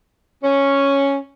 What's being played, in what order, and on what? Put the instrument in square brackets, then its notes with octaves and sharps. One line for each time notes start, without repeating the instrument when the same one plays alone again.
[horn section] C#4